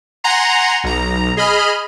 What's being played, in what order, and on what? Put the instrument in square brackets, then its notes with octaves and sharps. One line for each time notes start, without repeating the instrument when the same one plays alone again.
[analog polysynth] F#5 G#5 A#5 C6
B1 A#5
G#4 D#5 B5 F6